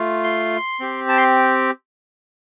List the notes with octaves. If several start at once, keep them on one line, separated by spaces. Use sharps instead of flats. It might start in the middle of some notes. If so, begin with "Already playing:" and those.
Already playing: A3 F4
C6
C4 G4
A5
C6